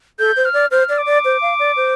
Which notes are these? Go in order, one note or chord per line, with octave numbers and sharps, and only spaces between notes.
A4 G6
C5
F6
D5
C5 F6
D5
D6
D5
C5
F5
D5
C5